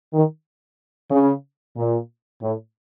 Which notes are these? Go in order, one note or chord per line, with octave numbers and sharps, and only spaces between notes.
D#3
C#3
A#2
A2